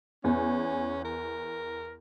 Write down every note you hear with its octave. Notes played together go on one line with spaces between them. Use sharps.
E2 C#4
A#4